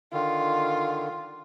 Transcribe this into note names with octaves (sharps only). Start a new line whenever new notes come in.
D3 D#3 F4